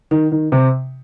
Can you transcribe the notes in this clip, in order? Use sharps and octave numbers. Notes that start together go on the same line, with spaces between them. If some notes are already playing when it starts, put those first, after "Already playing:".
D#3
D#3
C3